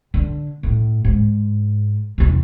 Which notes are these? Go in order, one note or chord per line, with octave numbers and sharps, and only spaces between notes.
D3
A2
G#2
E2 C3